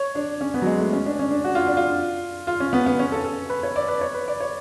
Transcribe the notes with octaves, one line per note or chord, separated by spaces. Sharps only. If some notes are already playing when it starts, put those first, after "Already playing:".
Already playing: C#5
D4
C#4
B3
F#3
G#3
A3
C#4
D4
C#4
D4
F#4
F4
D4
F4
F4
C#4
B3
B3
C#4
A4
A4
B4
C#5
D5
B4
C#5
B4
D5
C#5